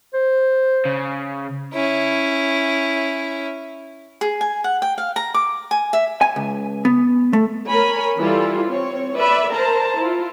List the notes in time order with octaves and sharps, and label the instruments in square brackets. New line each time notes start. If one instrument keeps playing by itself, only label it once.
[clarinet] C5
[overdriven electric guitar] C#3
[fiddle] C#4 E4
[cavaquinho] G#4
G#5
F#5
G5
F5
A#5
D6
G#5
E5
[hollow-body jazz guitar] G#5
C#2
B3
A3
[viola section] A#4 C#5 G#5 B5
E3 G3 E4 F4 A4
C4 C#5
B4 D5 E5 B5
A#4 C5 A5 A#5
E4 F4